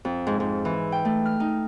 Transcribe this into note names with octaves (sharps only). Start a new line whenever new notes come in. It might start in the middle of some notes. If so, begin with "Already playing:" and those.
F2
G#2
G#2
E3
G5
A3
F6
D#4